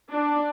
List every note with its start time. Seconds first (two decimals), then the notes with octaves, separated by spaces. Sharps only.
0.11 D4